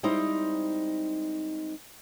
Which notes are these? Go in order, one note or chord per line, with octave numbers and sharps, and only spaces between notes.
G3 G#3 C4 D#4 E4 C5